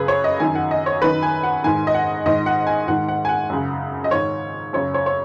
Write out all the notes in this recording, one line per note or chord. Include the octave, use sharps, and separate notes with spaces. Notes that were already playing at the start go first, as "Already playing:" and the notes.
Already playing: F#2 C#3 G#4 B4
C#5
D#5
F#2 D#3 G#5
F#5
D#5
C#5
F#2 D#3 B4
G#5
F#5
G#2 D#3 G#5
D#5
F#5
G#2 D#3 D#5
F#5
G#5
G#2 D#3 F#5
F#5
G#5
F#5
F#2 C#3
D#5
G#2 D#3 C#5
F#2 C#3 C#5
C#5
C#5